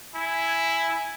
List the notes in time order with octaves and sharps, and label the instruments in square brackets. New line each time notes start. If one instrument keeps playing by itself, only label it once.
[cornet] E4 [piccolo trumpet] G#5